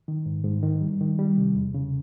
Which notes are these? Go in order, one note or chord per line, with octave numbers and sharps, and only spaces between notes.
D#3
G#2
G#2
D#3
G3
D#3
G3
C3
E2
C#3